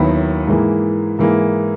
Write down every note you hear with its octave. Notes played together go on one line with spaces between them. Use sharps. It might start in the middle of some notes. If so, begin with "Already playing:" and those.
Already playing: D#2 D#3 F#3 B3 E4
G#2 E3 A#3 E4 G#4
G#2 E3 A#3 E4 G#4